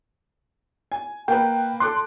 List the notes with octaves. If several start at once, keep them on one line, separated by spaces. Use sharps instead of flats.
G#5
A#3 B4 G5
A4 C6 D6 F#6